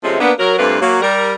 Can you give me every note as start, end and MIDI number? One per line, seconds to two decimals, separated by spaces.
0.03 0.17 48
0.03 0.17 53
0.03 0.17 56
0.03 0.17 57
0.03 0.17 60
0.03 0.17 61
0.20 0.32 58
0.20 0.32 59
0.20 0.32 62
0.39 0.57 54
0.39 0.57 70
0.58 0.78 43
0.58 0.78 46
0.58 0.78 57
0.58 0.78 58
0.58 0.78 60
0.58 0.78 71
0.81 1.01 54
0.81 1.01 58
1.02 1.33 55
1.02 1.33 70